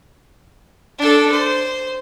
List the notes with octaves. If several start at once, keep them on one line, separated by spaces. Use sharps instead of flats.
D4 A4
C5